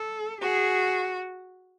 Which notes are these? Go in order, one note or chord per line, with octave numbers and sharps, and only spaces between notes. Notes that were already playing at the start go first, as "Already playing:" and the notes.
Already playing: A4
F#4 G#4